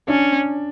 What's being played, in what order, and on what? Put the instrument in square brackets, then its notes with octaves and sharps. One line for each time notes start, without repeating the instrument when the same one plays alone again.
[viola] C#4 [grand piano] D4